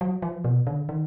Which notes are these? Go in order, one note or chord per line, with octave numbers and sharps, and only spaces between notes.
F#3
F3
B2
D3
D#3